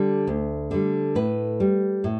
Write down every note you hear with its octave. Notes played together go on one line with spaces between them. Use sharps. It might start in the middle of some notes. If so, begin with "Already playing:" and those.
Already playing: D3 G3
D2
D3 G3
A2 B4
G3
A2